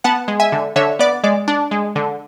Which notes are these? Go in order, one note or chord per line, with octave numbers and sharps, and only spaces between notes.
B3 F#5 A5
G#3
E5 G#5
D3
D3 C#5 E5
B3 D5
G#3 D5
D4
G#3
D3